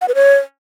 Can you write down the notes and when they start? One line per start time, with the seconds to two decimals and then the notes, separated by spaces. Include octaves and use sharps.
0.01 F#5
0.08 B4
0.15 C#5